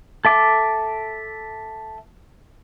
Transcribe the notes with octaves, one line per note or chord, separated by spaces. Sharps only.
A4 E5 D6